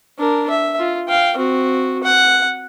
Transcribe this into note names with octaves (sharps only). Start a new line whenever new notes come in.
D4 A#4
E5
F4
F5 G5
C4 F#4
F#5